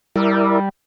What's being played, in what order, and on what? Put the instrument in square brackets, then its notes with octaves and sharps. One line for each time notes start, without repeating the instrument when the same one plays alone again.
[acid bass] G3 [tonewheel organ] E4 A#4 D5